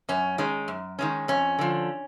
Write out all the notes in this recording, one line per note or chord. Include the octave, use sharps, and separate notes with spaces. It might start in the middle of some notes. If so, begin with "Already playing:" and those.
F#2 C#4
D#3 G#3 C#4
F#2
D#3 G#3 C#4
F2 C#4
D3 F3